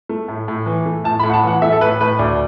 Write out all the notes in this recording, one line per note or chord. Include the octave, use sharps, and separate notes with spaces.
A3
A2
A2
E3
A3
A2 A5
B5
A2
F#5
A5
E3 F#5
A3 E5
A4
A2 B4
A2 B4
D2 D5